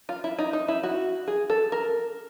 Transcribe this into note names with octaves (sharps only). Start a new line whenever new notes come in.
F4
E4
D#4
D#4
E4
F#4
G#4
A4
A#4